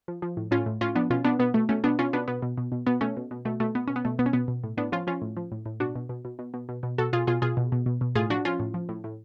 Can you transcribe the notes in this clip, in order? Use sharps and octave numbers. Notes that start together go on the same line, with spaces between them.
F3
F3
A2
A2 C#4 F4
A2
A2 C#4 F4
F3 B3 D4
B2 C#4 F4
B2 B3 D4
B2 B3
B2 A3
B2 A3 C#4
B2 B3 D4
B2 C#4 F4
B2 B3 D4
B2 B3
B2
B2
B2
B2 B3
B2 A3 C#4
B2
B2
B2 A3
B2 A3
B2 B3
B2 C#4
B3
B2 A3
B2 B3
C#4
B2 B3
B2
A2
A2 B3 D4
F3 C#4 F4
F3 C#4 F4
A2
F3
A2
A2
B2 D4 F#4
B2
B2
B2
B2
B2
B2
B2
B2 F#4 A4
B2 F4 G#4
B2 F4 G#4
B2 F4 G#4
B2
B2
B2
B2
A2 F4 G#4
F3 D4 F#4
F3 C#4 F4
A2
F3
A2
A2